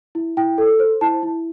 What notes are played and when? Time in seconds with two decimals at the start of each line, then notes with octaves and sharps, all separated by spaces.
0.15 E4
0.37 E4 G5
0.58 A4
0.79 C5
1.01 E4 A5
1.23 E4